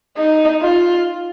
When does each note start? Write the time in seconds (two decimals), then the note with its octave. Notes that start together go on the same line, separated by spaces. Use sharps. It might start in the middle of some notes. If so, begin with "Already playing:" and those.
0.17 D#4
0.62 F4